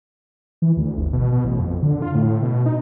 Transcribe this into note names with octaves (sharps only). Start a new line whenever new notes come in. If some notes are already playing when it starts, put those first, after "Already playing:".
E3
D2
G1
B2
B2
A1
F2
D3
F4
A2
B2
D#4